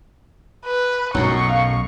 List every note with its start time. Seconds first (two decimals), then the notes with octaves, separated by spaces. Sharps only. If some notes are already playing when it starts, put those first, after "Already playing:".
0.65 B4
1.15 B1 F#2 A2 F#3 C#6
1.49 F5